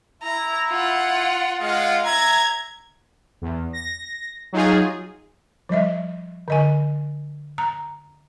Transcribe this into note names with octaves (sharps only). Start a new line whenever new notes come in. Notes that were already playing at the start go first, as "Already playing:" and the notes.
E4 A#5
F4 F#5
G#3 F4 F#5
E5 A#5 G#6
E2
A#6
F#3 D#4 F4 G#4
F3 G3 D#5 E5
D3 D#5 G#5
A#5